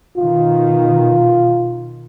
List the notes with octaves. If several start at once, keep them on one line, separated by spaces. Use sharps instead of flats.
B2 D#3 F4